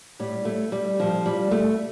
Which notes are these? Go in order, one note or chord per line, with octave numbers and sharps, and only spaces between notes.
A2 G3
A3
G3
A2 F3
G3
A3